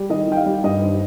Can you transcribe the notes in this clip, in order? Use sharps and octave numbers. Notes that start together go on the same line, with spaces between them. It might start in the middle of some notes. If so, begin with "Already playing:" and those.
Already playing: G3
D#3 D#5
D#3 G5
F5
G3
G2 D#5
D#3 C5